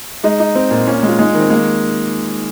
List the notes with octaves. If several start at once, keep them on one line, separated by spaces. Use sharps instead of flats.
G#3 D#4
D#4
C4
A#2
A#3 C#4
G#3 F4
G#3 D#4
D#4
D#3
C4
G#3 A#3